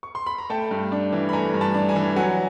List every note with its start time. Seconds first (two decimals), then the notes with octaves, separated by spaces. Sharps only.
0.03 C#6
0.15 C6
0.26 B5
0.38 A#5
0.50 A3 G5 A5
0.71 G2
0.92 D4
1.12 E3
1.29 B5
1.33 A3 G#5 A#5
1.54 G2
1.61 A5 B5
1.74 D4
1.89 G#5 A#5
1.96 E3
2.16 F#3 F#5 G#5